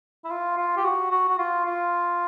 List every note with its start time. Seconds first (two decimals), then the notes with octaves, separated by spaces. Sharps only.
0.25 E4
0.30 F4
0.57 F4
0.77 G4
0.84 F#4
1.11 F#4
1.29 F#4
1.38 F4
1.66 F4